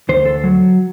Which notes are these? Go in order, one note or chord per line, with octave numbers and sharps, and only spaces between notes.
D2 C5
A4
F#3